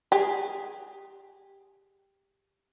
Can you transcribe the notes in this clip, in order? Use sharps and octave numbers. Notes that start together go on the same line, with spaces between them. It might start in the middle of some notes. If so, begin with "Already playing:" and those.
G4 G#4